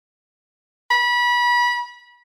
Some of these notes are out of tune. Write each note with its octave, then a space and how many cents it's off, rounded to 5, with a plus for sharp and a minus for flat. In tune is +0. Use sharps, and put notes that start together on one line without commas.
B5 -30